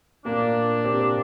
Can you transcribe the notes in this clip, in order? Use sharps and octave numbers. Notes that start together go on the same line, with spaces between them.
A#2 A#3 D4
C3 C4